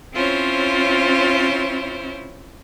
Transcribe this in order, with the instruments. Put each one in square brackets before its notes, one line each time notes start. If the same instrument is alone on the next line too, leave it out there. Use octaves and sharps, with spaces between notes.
[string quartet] C4 C#4 E4 F4 C5 C#5